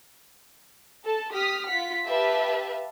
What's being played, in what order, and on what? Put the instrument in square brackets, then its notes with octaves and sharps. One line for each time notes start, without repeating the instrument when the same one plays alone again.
[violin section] A4 A5
G4 D#6 F6 B6
F4 F#5 B6
G4 B4 E5 F5 A5